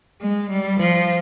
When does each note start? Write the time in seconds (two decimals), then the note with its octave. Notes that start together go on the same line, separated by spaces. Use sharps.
0.21 G#3
0.50 G3
0.79 F3